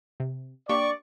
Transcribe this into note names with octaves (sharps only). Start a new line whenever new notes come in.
C3
A#3 D4 G4 D5 C#6